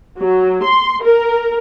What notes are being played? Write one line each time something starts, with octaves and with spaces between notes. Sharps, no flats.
F#3
C6
A#4